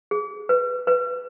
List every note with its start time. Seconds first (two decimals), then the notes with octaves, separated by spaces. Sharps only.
0.11 G#4
0.49 B4
0.87 B4